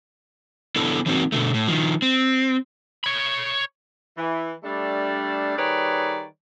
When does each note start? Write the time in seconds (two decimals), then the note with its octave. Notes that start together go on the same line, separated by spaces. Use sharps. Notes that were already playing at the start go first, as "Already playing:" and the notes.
0.76 B3 D4 E4 A4
1.06 E3 F#3 A#3 C4 D#4 F#4
1.32 B2 D3 A3
1.54 A2
1.68 D#3 F3
2.02 C4
3.04 C#5 B5
4.17 E3
4.63 G3 A3 D4
5.57 D#3 G3 G#4 B4 C#5 D5